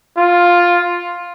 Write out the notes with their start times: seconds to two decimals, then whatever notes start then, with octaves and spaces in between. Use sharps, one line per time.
0.17 F4